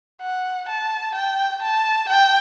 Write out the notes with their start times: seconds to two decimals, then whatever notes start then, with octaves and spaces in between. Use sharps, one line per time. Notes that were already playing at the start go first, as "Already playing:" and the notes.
0.22 F#5
0.69 A5
1.15 G5
1.62 A5
2.09 G5